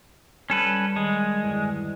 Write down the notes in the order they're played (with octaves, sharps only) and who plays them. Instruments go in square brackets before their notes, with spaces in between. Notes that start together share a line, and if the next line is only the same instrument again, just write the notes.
[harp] G3 [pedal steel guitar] C#4 A4 B4
[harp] D#3 [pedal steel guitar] G#3
[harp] E2 G2 D3